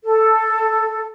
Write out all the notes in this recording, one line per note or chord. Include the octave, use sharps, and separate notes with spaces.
A4